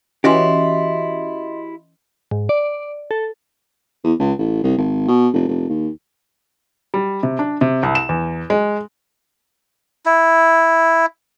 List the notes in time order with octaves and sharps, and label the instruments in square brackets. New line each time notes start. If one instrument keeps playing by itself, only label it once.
[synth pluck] E3 C#4 [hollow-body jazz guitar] E4 F#4 G4 [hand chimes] D#5 C6
[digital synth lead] G#2
D5
A4
[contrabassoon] E2
C#2
A1
C2
G#1
B2
F1
F1
D#2
[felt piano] G3
C3
D4
C3
C2
E7
E2
G#3
[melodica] E4